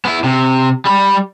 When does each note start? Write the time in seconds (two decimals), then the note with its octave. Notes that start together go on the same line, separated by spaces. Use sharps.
0.05 B3 E4
0.24 C3
0.85 G3 B5